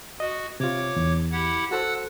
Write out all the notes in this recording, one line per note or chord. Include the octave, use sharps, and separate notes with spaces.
F#4 D#5
C3 F4 C#5 D6
E2
E4 G4 F#5
F#4 A4 C5 F#5 E6 F#6